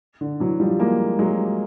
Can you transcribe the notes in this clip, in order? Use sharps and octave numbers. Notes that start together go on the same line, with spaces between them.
D3
E3 F#3
F3 G3
G#3 A#3
F#3 G#3